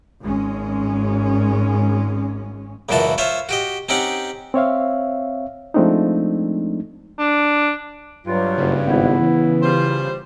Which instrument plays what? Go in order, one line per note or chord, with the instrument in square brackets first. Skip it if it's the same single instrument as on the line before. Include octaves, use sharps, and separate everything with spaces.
[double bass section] G#1 G#3 C#4
[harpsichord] C#2 F#2 A#2 E3 F#4 A5
F4 C5 C#5 E5
F#4 G4 D#5
C4 C#4 D#4 G4 F#5
[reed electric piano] C4 C#5 E5 F5
F3 G#3 A3 C4 D4 D#4
[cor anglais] D4
[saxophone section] G2 [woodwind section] F#3 F4
[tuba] F#1 [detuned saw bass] C#3
[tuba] G#1 [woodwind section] B3 E4
[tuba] E3
[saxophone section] G3 F4 C5